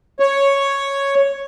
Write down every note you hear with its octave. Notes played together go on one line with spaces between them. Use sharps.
C#5